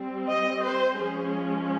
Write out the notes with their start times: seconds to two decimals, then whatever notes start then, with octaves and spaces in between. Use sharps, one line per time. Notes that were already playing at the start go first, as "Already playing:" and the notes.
Already playing: G3 C4
0.29 D#5
0.64 C5
0.98 F3 G#3 C#4 G#4